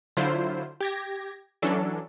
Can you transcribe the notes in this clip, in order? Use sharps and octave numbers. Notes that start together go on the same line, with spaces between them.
D3 F#3 E4 F4 C5
G4 G#6 A#6
E3 F#3 C#4 D4 A4